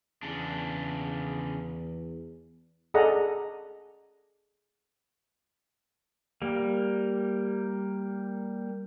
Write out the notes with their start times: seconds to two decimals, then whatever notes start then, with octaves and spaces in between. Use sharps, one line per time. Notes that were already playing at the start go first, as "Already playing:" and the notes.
0.23 E2 C#3 D4
2.94 G#4 A4 D5 D#5 F#5 A#5
6.42 G3 A#3